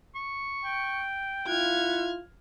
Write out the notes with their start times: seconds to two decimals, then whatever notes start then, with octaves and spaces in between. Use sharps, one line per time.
0.15 C#6
0.65 G5
1.48 E4 F4 F#5 F6 G#6